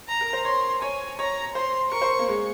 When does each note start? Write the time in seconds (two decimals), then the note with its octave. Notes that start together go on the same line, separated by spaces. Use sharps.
0.08 A#5
0.21 A#4
0.33 C5
0.45 C#5 C6
0.82 C#5 G#5
1.19 C#5 A#5
1.55 C5 C6
1.91 A#4 C#6
2.02 C5
2.19 A#3
2.28 G#3